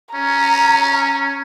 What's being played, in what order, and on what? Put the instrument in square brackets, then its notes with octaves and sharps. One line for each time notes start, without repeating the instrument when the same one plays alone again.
[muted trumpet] C#4 [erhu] A#5